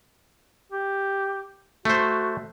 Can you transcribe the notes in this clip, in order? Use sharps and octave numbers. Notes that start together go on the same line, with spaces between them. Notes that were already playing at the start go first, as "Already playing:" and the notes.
G4
A3 F#4 C5